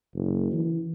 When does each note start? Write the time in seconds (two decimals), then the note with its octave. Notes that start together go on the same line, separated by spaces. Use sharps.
0.15 F#1
0.53 E3